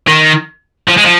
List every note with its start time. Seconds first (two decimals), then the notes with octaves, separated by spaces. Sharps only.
0.08 D#3
0.88 F3
0.97 G#3
1.04 F3